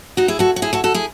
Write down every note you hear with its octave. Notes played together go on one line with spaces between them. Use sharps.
D#4 F#4
E4 G#4
F#4 A4
F#4
E4 G#4
F#4 A4
F#4 A4
E4 G#4